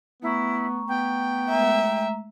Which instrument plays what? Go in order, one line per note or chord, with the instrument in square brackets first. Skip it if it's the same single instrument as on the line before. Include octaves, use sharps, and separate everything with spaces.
[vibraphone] A3 A#5 C#6 [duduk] B3 [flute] E4
[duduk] B3 [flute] G5
[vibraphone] G#3 A3 A#5 [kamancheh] E5